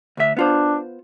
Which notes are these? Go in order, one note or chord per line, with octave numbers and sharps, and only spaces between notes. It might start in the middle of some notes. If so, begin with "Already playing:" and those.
D2 E5
B3 D4 F4 C5